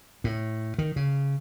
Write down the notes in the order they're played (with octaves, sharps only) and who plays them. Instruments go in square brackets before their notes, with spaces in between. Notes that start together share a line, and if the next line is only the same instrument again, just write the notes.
[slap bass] A2
D#3
C#3